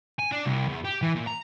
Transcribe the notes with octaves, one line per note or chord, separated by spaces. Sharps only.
G#5
D4
C2
E2
G4
E3
A#2
A#5